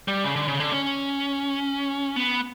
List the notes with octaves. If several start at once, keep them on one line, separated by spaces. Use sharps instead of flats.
G3
C#3
D3
C#3
D3
C#4
B3